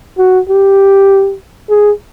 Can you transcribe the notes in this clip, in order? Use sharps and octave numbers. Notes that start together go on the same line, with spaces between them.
F#4
G4
G#4